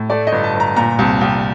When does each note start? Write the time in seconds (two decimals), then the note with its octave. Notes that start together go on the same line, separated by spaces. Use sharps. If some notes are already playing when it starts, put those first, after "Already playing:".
Already playing: A2
0.10 A3 D5
0.27 G1 D#5
0.44 A5
0.54 G1
0.60 A#5
0.76 A#2 A#5
0.99 C2 A5
1.21 C2 G5